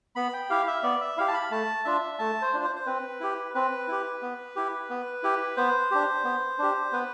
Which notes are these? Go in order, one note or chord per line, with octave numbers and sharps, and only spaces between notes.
B3 B5
G5
E4 G4 F5
E5
B3 D5
E5
E4 G4 F5
A5
B5
A3 A5
D4 F4 E5
A3 A5
C5
D4 F4
C5
C5
C4 B4
E4 G4
C4 B4
E4 G4
B3
E4 G4
B3
E4 G4
B3 C5
D4 G4
B3
D4 G4
B3 B4